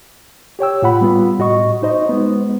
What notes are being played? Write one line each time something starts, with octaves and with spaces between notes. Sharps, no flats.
G4 C#5 G5 E6
A2 F4 F#5 B5
G3 B3 F4
A2 F#4 D#5 C#6
D#4 C5 D#5
G#3 B3